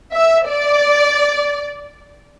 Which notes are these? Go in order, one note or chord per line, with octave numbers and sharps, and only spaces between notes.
E5
D5